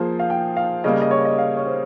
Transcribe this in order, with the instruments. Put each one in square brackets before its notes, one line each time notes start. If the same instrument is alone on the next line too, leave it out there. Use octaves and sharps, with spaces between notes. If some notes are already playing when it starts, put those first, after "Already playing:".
Already playing: [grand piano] F3 A#3 F4 G#4 C5
[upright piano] F5
G5
F5
[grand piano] C#3 G3 A#3 [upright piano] D#5
[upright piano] D#5
C#5
D#5
F5
C#5
C5